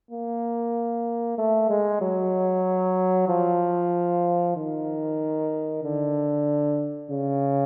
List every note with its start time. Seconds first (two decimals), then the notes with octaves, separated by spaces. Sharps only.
0.11 A#3
1.38 A3
1.70 G#3
2.01 F#3
3.29 F3
4.56 D#3
5.84 D3
7.11 C#3